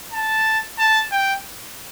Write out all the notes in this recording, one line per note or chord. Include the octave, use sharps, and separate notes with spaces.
A5
A5
G5